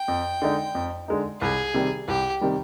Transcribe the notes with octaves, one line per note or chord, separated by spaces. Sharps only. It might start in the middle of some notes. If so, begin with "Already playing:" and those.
Already playing: G5
F2
D3 G#3 D#4
F2
D3 G#3 D#4
C2 G#4
C3 D#3 G3
C2 G4
C3 D#3 G3